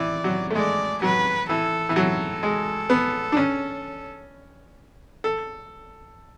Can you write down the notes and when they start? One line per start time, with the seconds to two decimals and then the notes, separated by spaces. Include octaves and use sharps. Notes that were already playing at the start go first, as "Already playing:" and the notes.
Already playing: E3 D5
0.24 F#3
0.50 A3
0.55 G#3 D5
1.02 F#3 B4
1.49 E3 A4
1.89 E3
1.96 F#3 A4
2.43 G#3
2.90 B3
3.32 D4
3.37 C#4
5.24 A4